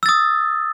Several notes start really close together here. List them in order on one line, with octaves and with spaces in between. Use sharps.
E6 A6 D#6